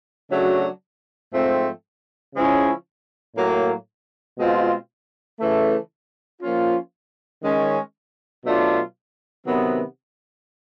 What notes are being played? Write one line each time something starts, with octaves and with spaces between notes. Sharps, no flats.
C#3 F#3 A3 D4 F#4
G#2 F3 A3 C4
C#3 F3 G#3 C#4 E4
A2 F#3 A#3
B2 G#3 C4 F4
C#3 E3 A3
F3 A#3 C#4 F4
D#3 G#3 C#4
B2 F#3 A3 D4 F4
C3 D#3 F#3 B3